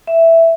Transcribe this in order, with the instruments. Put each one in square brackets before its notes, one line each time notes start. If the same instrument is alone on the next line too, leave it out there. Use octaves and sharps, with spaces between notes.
[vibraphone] E5